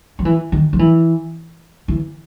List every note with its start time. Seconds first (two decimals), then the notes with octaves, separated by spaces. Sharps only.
0.19 F3
0.25 E3
0.52 D#3
0.73 F3
0.79 E3
1.88 E3